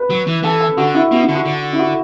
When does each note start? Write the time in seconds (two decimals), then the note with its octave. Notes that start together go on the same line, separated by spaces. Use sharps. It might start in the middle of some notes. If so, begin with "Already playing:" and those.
Already playing: B4
0.10 F#3
0.27 E3
0.43 E3 A4
0.60 A4
0.77 D3 F#4
0.94 E4
1.11 B2 F#4
1.23 D3 E4
1.35 F#4
1.45 D3
1.73 E4
1.79 F#4